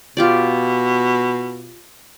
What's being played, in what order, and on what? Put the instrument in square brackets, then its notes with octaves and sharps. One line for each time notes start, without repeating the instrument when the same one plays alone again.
[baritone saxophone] B2 [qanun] F4 G4 D5